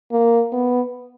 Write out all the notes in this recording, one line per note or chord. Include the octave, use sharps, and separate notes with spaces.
A#3
B3